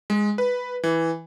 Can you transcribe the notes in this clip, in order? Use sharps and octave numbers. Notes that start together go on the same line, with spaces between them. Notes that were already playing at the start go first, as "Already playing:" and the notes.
G#3
B4
E3